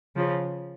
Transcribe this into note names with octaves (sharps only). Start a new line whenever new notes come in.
C#3 F3